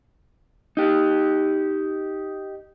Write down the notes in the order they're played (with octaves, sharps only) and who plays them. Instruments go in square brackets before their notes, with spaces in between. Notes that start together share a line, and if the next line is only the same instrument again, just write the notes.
[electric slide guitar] D#4 G4